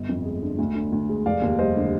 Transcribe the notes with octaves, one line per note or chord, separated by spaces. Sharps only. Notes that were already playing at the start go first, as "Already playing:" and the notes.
Already playing: G1 D#5
F2
G#3
D3
D2
D3
D2
G#3
F1 D5 F5
D#2
G3 C5 D#5
D3